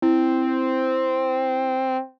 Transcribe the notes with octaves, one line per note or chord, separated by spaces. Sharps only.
C4 E4